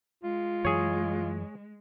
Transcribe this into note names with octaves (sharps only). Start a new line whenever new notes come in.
G#3 F4
F#2 E3 G#4 C#5